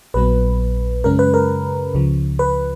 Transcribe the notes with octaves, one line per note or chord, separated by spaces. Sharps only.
A#1 A#2 F#3 B3 B4
F#2 C#3 G#3 C#4 A#4
B4
A#4
C#2 C#3 F3
B4